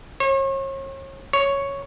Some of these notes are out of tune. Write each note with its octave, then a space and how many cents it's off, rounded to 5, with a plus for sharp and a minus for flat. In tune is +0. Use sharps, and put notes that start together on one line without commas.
C#5 -40
C#5 +0